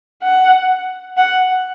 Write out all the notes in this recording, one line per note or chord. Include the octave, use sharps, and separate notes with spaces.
F#5
F#5